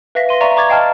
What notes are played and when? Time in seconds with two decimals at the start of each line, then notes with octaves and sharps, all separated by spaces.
0.15 B4 E5 F5 A#6 B6
0.29 C6 D#7
0.40 D5 E5 F5 A#5 C6 C#6
0.56 A#5 C#6 D6 G#6 A6
0.69 D#5 F5 G5 A5 F6